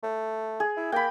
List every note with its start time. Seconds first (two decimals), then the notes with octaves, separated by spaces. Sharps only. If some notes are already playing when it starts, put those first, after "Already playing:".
0.03 A3
0.60 G#4
0.77 E4
0.92 A#3 G5 B5